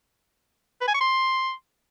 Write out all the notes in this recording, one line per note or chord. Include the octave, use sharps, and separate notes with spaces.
B4
G#5
C#6
C6